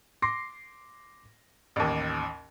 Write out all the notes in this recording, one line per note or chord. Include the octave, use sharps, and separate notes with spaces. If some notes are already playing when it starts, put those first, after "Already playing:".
C6 D6 A#6 C7
A1 D#2